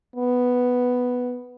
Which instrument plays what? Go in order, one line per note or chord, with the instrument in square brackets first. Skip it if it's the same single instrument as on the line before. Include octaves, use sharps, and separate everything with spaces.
[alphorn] B3